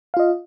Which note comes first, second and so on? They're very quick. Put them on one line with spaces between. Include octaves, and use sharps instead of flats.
F5 F4 D#5